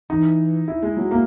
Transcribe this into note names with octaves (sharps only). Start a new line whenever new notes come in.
E3 D#4
E4
G#3
F#3
A#3